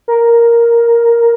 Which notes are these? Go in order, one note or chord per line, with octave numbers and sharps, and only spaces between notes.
A#4